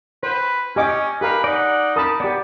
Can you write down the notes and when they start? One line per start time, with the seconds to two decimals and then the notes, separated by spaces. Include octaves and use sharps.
0.23 B4 C5
0.76 C#4 G4 D#5 G#5 D6
1.21 G4 A#4 B4 F5
1.44 D#4 D5 F#5
1.96 A#4 A5 B5 D#6
2.20 B3 G4 D5